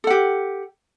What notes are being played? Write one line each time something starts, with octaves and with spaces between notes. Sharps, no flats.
G4 A4 F#5